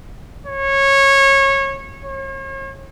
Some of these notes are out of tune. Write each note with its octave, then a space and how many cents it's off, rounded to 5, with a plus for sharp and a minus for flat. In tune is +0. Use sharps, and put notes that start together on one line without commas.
C#5 -20
C#5 -40